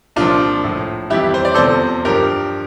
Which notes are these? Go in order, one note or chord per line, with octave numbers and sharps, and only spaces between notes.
C2 A#2 F3 D4 F4
A2 F3
F2 E3 G3 E4 G4
C5
D5
E2 C3 F3 A4 C5
G2 F3 G4 A#4